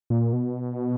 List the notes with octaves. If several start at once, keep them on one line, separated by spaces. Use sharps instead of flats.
A#2
B2